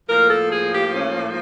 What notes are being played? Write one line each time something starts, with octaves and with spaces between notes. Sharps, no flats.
A2 F3 A#3 A#4
A4
G#4
G4
C#4